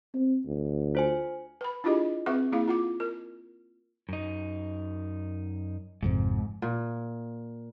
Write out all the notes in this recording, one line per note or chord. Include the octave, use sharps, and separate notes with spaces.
C4
D2
F4 C5 G#5
B4 B5
D4 E4 F4 G4 G#4 D#5
C4 G#4 B4 E5 F#5 C#6
A#3 E4 G#4 F5
F4 F#5 D6
A#4
F#2 D#4
G#1 F2 G#2 C3
A#2